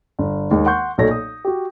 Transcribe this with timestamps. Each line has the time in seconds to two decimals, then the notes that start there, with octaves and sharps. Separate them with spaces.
0.19 G1
0.51 D#2 D#3 G#3
0.66 F#5 C6 C#6 G6
0.98 B1 A#2 F#3 A4 C#5 A#6
1.11 D#6
1.45 F#4 G4